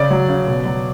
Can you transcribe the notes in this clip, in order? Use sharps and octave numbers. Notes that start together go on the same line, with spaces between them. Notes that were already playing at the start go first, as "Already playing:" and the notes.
Already playing: C#3 D5
F#3
C#3
B2
F#3